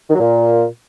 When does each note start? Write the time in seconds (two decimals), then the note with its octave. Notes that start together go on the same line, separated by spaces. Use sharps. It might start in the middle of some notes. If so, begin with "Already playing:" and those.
0.09 D#3
0.15 F#3
0.20 A#2